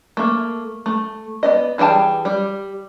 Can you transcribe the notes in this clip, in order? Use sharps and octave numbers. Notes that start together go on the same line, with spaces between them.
A3 A#3
A3
B3 D5 D#5
E3 G3 G#4 G5 A5
G3